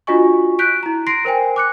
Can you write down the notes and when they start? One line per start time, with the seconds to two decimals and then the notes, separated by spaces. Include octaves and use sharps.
0.07 D4 F4 F#4 D#5 G#5 C#6
0.59 F#6 G6 B6 D7
0.83 E4 A#5
1.07 C6 A#6 C7 D7
1.25 A#4 C5 G5 G#5
1.56 D6 F#6 C#7